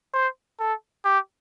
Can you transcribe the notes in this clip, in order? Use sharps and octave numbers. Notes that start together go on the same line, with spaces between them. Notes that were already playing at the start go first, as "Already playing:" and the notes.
C5
A4
G4